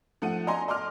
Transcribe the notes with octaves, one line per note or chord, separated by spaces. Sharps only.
F3 A3 F#5 D#7
D#5 G#5 A#5 C6
D#5 C6 D6 F6